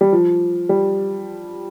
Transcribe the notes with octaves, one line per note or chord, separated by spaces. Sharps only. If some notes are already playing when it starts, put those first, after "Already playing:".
G3
F3
G3